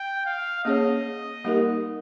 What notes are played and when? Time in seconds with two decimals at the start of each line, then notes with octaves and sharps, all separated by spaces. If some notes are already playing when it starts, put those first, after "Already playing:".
Already playing: G5
0.25 F5
0.64 A#3 C#4 G#4 C#5 D#5
1.45 G3 A#3 D#4 G4 A#4